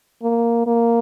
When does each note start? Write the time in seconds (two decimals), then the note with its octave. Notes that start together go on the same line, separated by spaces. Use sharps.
0.23 A#3
0.67 A#3